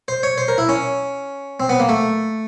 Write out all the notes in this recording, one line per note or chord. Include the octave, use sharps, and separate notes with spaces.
C5
C#5
C5
A#4
E4
C#4
C4
B3
A#3
A3